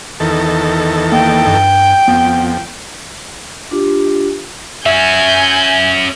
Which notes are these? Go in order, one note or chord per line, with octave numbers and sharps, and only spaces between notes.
E2 D#3 A4
A#3 G5
G2
F2 B3
D4 F4 G4
C#4 F#4 E5 G#5 G6